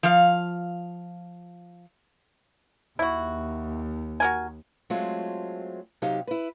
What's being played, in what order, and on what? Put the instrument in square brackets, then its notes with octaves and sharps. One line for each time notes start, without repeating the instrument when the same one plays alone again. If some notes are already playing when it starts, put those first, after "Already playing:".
[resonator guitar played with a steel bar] F3 F5
[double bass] D#2 [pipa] E4 F#4
[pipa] F#4 A#4 G#5
[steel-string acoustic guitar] F#3 G#3 A3 C4 F4
C3 F#3 D#4 G4 F5
E4 B4